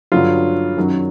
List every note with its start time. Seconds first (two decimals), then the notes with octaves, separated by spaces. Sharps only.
0.12 G2 D3 F#3 F4
0.77 F#2 D#3 F#3